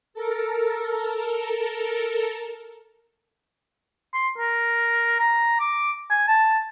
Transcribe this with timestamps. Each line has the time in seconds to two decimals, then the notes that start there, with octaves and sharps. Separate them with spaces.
0.14 A4 A#4
4.14 C6
4.38 A#4
5.19 A#5
5.60 D6
6.10 G#5
6.28 A5